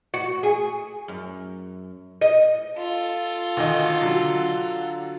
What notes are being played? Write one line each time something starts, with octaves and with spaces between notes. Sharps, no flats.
F#4
G#4
F#2
D#5
F4 A4
D2 D#3 D#5
D3 F#3